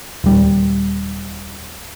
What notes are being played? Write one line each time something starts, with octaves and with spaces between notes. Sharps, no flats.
D#1 G3